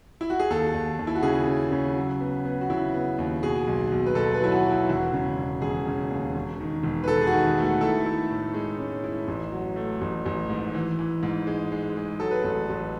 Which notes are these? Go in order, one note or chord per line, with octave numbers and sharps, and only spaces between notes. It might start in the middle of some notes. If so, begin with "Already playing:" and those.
E4
F#4
G#4
D#2 A4
D#2
D#2
E4
F#4
C#3 G#4
C#3
C#3
F#3
B3
B3
F#4
C#3 E4
B3
D#2
B2 G#4
B1
B1
B4
B1 A4
B4
F#3 E4
F#4
F#3
E4
E1 F#4
C#3
E1
E1 G#4
C#3
D#2
E1
D#3
E1
B4
E1 A4
G#4
F#4
D#3
A3 F#4
E4 A4
E4
A2
G#3
C#4
E4
A1
F#3
A3
A1
A1
G#2
E3
E3
G#2
G#3
G#3
G#3
F#3 A4
B4
A1 A4
A1